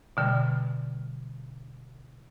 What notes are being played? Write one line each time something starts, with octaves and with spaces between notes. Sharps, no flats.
B2 D3 G3